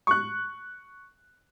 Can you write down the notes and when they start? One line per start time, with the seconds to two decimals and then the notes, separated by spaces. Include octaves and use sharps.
0.07 C#6 F#6